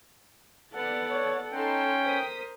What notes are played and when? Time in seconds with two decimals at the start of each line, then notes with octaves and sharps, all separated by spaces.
0.73 B3 A4 D5 F#5 A6
1.10 C#5
1.54 C#4 D#4 A4 G5 C6
2.05 A#4 C5 D#6 B6